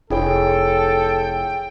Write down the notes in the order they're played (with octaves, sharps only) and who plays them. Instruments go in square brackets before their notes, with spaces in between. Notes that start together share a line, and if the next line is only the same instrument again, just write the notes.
[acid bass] F1 [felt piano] E4 G#4 C#5 [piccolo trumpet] A4 [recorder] G5